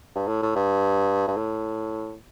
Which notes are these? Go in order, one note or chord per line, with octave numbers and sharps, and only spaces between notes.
G2
A2
A2
G2
G2
A2